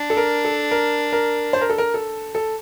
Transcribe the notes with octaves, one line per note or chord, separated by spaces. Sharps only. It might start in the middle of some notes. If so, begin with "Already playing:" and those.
Already playing: D4
A4
A#4
A4
A#4
A#4
C5
A#4
A4
A#4
A4
A4